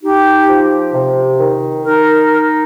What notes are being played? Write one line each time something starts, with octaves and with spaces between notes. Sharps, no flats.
D#4 G4
F3
C3
D#3
D#4 A#4